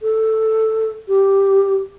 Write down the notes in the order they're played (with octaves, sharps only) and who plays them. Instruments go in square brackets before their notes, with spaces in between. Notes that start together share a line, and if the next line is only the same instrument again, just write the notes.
[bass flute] A4
G4